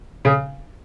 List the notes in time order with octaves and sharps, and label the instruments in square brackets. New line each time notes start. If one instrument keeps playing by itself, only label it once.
[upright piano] C#3